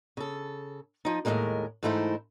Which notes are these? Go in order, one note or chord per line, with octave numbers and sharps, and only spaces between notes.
C#3 A4
F3 D#4
D#2 A2 C3 D#3 G#3 A#4
G#2 E3 A3 D#4 E4 C5